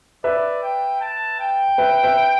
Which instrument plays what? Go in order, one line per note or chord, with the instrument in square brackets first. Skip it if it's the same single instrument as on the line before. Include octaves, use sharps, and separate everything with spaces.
[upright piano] B4 E5 [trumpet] D5
[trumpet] G5
A5
G5
[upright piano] B4 E5
B4 E5